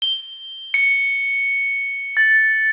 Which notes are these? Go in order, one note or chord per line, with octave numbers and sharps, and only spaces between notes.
G7
C#7
A6